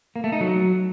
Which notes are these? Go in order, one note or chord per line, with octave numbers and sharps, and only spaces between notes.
A#3
A3
D#4
F#3